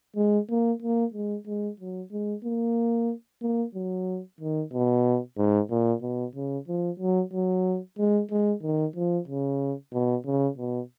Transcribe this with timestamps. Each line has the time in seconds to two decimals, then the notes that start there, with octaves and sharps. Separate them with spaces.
0.16 G#3
0.49 A#3
0.82 A#3
1.14 G#3
1.47 G#3
1.80 F#3
2.12 G#3
2.44 A#3
3.42 A#3
3.75 F#3
4.40 D#3
4.73 B2
5.37 G#2
5.70 A#2
6.02 B2
6.35 C#3
6.68 F3
6.99 F#3
7.33 F#3
7.98 G#3
8.31 G#3
8.63 D#3
8.96 F3
9.28 C#3
9.93 B2
10.26 C#3
10.58 B2